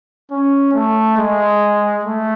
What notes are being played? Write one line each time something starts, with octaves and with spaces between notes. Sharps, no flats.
C#4
A3
G#3
A3